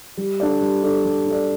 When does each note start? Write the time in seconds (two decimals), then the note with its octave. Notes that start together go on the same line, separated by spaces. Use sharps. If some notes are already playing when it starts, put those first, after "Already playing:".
0.17 G3
0.40 D4 A4 D5
0.61 G3
0.83 D4 A4 D5
1.04 G3
1.26 D4 A4 D5